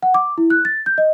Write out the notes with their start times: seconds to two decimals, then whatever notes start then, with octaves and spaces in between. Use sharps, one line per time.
0.03 F#5
0.14 D6
0.38 E4
0.50 F#6
0.65 A6
0.86 G6
0.98 D#5